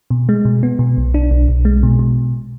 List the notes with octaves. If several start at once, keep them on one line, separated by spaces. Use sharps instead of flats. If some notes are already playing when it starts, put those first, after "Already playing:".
B2
G#3
B2
B3
B2
B1
D4
B1
B1
G#3
B2
B2